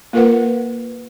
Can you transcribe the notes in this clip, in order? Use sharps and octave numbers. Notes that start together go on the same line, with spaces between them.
A#3 F4 A#4 B4 F#5